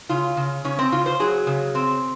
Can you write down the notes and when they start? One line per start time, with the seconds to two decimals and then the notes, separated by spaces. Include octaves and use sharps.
0.09 C#3 F4
0.37 C#3
0.64 C#3 C#4
0.79 C4
0.92 C#3 F4
1.06 C5
1.20 F#3 G#4
1.47 C#3
1.75 C4